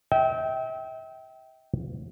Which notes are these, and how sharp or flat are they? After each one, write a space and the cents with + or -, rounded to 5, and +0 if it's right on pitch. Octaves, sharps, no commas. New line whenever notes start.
E5 -40 G5 -15